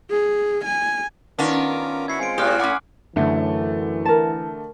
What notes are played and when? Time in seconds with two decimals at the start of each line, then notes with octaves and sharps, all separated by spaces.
0.10 G#4
0.64 G#5
1.39 D#3 B3 C#4 D4 F4 A#4 D6
2.08 E4 F#4 E5 G#6 C7 C#7
2.20 G#3 C4 F4 G#5 C7 D7
2.38 A2 G4 D#6 F6 F#6
2.59 C#4 F#5 B5 C6 D6 F#6
3.16 F#2 D3 E3 A3
4.05 A#4 A5